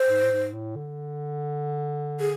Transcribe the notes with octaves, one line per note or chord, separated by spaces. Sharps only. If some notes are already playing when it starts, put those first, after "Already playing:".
Already playing: C5
G#2
A2
G#2
A2
D3
G#4